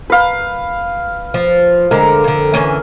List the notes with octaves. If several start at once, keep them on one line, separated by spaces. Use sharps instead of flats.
B4 F5
F3
D3 G#3 A#4
F2 D3
D3 E3 C#4